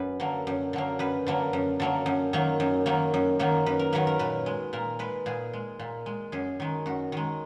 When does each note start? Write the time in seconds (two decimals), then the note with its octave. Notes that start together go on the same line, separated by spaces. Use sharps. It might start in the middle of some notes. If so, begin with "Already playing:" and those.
Already playing: F#2 B4
0.20 D3 F#3 A#3
0.47 F#2
0.73 D3 F#3 A#3
0.99 F#2 B4
1.27 D3 F#3 A#3
1.53 F#2
1.80 D3 F#3 A#3
2.06 F#2
2.33 D#3 F#3 A#3
2.60 F#2
2.86 D#3 F#3 A#3
3.14 F#2
3.39 D#3 F#3 A#3
3.66 F#2 B4
3.79 A#4
3.92 D#3 F#3 A#3 B4
4.07 A#4
4.19 A#2 B4
4.46 G#3
4.73 A#2 A#4
4.99 G#3 B4
5.26 A#2 G#4
5.53 G#3
5.79 A#2
6.06 G#3
6.32 F#2 G#4
6.60 D#3 G#3
6.86 F#2 F#4
7.12 D#3 G#3